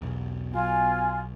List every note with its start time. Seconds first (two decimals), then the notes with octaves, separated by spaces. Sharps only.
0.02 B1 E2
0.53 B1 F4 G#5